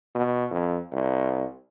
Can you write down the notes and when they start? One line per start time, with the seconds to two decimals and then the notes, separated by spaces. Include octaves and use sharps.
0.15 B2
0.50 F2
0.93 C2